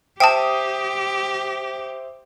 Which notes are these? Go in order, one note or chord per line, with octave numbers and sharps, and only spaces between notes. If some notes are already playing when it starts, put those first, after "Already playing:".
G4 C5 E5 G5 A5 D#6